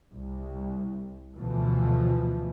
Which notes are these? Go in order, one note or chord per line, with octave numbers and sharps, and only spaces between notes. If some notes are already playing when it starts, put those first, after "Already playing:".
C2
D2 B2 E3 F3